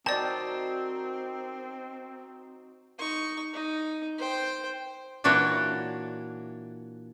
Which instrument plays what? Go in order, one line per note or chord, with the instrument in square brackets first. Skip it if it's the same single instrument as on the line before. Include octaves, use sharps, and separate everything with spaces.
[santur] F#3 D#4 D6 [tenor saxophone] C4 [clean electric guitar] A#4 G5 [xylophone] D5 A5
[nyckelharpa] D#4 C#6
D#4
C5 G5
[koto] A#2 E3 D4 F#4 C#5